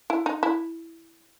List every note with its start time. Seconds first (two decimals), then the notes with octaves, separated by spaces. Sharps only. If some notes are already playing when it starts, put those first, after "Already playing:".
0.10 E4
0.26 D#4
0.43 E4